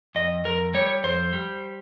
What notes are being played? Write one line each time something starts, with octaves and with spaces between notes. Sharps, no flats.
F2 D#5
F2 A#4
G3 C#5
F2 C5
G3